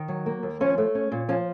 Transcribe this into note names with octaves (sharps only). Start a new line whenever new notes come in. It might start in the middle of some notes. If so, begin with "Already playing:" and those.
Already playing: D#3
F#3
A#3
D#2
F3 C#4
A3
C#4
A#2
F3 C#4